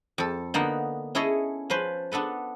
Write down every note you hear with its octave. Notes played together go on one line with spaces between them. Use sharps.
F2 A4
D3 A#3 B3 D#4 F#5
C#4 E4 G#4 A4 C#5 D#5
F3 C#4 B4 C5
B3 D4 A4 B4